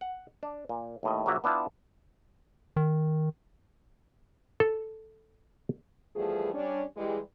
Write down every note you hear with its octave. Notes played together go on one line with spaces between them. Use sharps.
F#5
D4
A#2
D#2 A2 D#5
A#1 F#3 A#3 F#4 D5 E5
B3 D4 E4 F4 G5 A5
D#3
A4
E2 F3 G3 A3 B3 G#4
G3 C#4 D4
E3 G3 G#3